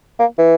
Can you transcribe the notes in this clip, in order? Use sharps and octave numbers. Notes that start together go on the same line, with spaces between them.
A#3
E3